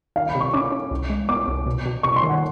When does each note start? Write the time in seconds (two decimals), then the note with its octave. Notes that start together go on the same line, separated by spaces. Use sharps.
0.16 D#3 F5
0.29 B5
0.35 C3
0.40 C#6
0.54 C#4 D6
0.72 C#4
0.91 C2
1.10 G#3
1.29 B3 D6
1.48 C2
1.66 B2
1.86 B2
2.03 C3 C#6
2.16 C6
2.23 D#3
2.29 F#5